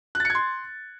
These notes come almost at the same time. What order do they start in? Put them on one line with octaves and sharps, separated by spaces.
F#6 A6 C#7 G#6 C6